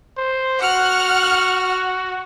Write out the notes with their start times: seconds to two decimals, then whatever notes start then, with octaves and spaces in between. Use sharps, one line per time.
0.17 C5
0.62 F#4 F#5 F6 F#6